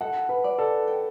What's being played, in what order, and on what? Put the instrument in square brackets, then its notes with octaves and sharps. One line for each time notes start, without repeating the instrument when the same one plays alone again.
[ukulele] A4 [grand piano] F#5
[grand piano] B4
[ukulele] D5
[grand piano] A4
[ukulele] G5